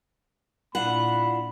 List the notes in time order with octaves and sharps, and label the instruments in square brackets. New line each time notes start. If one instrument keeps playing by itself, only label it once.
[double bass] A#2 [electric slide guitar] D4 E4 F4 [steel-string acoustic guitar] F#5 [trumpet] B5